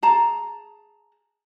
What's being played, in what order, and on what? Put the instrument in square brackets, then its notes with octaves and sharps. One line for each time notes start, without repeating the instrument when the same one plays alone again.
[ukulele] G#4 A5 A#5